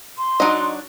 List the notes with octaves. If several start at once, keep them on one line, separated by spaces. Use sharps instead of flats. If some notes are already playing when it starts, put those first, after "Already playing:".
C6
F#3 D4 D#4 F#4 D#5